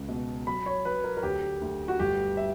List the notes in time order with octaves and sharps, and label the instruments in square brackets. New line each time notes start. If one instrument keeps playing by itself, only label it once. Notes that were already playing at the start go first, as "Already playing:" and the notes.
Already playing: [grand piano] C#2
B2
F#3 B5
C#5
F#3 B4
A#4
A#4
D2 G4
D2
F#4
G1 G4
E5